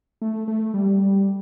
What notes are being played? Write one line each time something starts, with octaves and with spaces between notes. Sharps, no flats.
A3
A3
G3